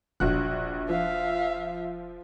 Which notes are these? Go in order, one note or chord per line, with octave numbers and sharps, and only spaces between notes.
E1 A#1 F#4 F#6
F3 E5 F5